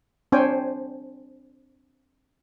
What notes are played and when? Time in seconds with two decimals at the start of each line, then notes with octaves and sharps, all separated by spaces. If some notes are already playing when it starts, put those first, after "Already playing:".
0.32 C4 D4 C5 C#5 G5 G#5